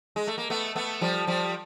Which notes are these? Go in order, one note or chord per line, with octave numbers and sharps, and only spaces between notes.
G#3
A3
A#3
A3 B3
A3 B3
F3 G3
F3 G3